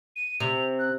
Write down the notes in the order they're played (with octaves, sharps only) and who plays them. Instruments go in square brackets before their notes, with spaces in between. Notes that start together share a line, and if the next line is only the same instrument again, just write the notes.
[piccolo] D#7
[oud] C3 [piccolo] F7
[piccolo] F#6